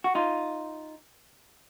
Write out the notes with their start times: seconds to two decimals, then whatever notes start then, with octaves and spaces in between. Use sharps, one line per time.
0.04 F#4
0.15 D#4 F4